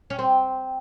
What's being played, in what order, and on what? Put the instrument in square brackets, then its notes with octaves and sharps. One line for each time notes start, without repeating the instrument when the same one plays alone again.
[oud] C#4
C4